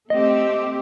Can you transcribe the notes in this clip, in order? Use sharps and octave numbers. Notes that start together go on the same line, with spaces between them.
A3 C4 G4 D#5